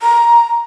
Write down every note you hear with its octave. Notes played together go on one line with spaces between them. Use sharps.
A#5